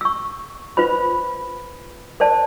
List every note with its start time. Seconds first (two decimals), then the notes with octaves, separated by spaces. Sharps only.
0.01 C#6 E6
0.77 F4 B4 C5 B5
2.20 A#4 C5 D5 A5